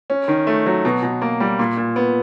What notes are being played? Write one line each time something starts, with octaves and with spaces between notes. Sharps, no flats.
C#4
D#3
A3
F#3
B2
B2
A#3
G3
A#2
A#2
B3